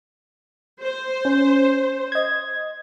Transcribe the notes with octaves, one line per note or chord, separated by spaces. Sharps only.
C5
C#4
D#5 G#6